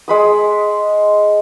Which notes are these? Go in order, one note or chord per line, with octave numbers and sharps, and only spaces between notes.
G#3 B5 D#6